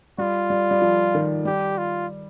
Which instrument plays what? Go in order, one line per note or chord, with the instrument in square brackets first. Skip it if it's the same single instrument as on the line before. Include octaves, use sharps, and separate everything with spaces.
[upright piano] G3 [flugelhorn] F4
[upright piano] G3
G3
F3
D#3
[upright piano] G3 [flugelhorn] G4
[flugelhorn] F4